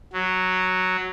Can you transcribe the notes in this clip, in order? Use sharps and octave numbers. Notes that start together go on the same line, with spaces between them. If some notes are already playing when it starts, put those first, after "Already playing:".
F#3